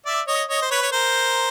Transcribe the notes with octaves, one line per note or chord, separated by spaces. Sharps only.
D5 E5
C#5 D#5
C#5 D#5
C5
B4 C#5
C#5
A#4 C5